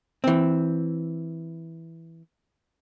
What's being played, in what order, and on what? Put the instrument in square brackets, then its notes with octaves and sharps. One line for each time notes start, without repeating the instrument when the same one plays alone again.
[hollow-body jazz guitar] E3 C4